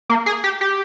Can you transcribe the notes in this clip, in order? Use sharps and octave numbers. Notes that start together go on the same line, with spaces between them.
A#3
G#4
G4
G4